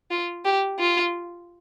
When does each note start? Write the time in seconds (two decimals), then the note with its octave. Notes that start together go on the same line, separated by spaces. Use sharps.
0.11 F4
0.45 G4
0.79 F4